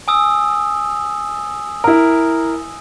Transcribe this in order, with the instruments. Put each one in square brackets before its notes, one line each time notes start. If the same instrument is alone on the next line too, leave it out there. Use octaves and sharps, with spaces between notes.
[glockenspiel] G#5 D#6 E6
[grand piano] E4 A#4